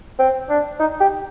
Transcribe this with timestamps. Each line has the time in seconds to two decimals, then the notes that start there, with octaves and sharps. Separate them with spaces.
0.19 C4
0.49 D4
0.80 D#4
1.00 G4